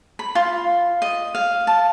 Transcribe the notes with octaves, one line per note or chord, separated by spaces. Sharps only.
B5
F4
D#5
F5
A5